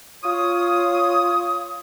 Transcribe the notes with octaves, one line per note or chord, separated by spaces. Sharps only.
F4 C#5 D#6